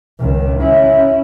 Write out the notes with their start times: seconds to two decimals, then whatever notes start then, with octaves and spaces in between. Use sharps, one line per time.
0.19 C#2 D#3
0.60 C#4 E4